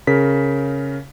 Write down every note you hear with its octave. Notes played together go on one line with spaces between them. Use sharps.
C#3 A#4 B6